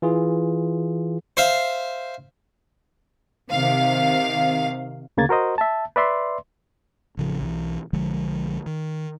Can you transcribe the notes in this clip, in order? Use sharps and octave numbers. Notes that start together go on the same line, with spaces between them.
E3 F4 G#4
C5 E5 F5
C3 D#3 F5
D2 C#3 A#3 G#6 A6
F#4 A#4 C5 D#5
E5 A5
B4 D5 E5 C6
A1 C#3 F3
B1 D#3 E3
B1 D3 F3 G#3
D#3